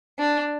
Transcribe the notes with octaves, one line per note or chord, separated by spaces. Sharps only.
D4